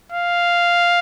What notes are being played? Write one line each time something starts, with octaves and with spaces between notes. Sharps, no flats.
F5